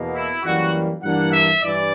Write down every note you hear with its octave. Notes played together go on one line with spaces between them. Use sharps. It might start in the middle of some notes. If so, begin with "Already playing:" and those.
Already playing: E2 B2 A#3
E4
F#2 E3 G3 A#3 F#4
G2 E3 A#3 D4 F#5
E5
G2 E3 D5